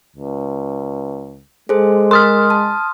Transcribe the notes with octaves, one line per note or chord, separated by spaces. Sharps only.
C#2
G#3 G#4 A4 C5
A#4 C6 D#6 F6
A5